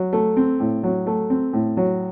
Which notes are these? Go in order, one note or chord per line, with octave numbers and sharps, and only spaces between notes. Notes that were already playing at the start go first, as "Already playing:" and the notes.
Already playing: F#3
A3
C4
A2
F#3
A3
C4
A2
F#3